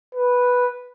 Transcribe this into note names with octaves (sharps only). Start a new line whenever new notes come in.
B4